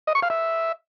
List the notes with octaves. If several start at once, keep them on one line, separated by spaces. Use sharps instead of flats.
D#5
C#6
F5
E5